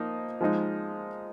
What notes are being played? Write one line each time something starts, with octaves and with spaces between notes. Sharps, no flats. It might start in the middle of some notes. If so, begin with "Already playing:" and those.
Already playing: F3 A#3 D#4
F3 G#3 D#4